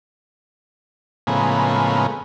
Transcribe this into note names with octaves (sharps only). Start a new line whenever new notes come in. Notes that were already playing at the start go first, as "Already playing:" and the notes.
A2 C#3 F3 G#3 A#3 B3